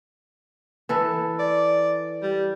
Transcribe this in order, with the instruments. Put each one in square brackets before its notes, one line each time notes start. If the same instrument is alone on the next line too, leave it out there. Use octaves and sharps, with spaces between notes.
[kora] E3 A4 B4
[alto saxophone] D5
G3